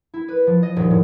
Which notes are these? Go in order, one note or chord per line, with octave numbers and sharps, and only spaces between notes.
E4
B4
F3
D#5
D#1
A2